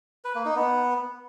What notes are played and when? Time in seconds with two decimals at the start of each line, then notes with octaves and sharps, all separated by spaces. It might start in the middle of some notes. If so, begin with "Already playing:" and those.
0.25 B4
0.35 A#3
0.45 D#4
0.56 B3